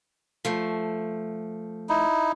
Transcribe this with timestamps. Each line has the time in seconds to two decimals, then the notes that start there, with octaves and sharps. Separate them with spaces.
0.45 F3 A3
1.89 D#4 E4